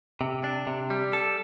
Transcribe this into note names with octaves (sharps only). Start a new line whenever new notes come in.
C3
D4
C3
G3
A4